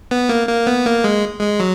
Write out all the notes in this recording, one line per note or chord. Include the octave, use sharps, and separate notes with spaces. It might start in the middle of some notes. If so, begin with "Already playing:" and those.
B3
A#3
A#3
B3
A#3
G#3
G#3
F#3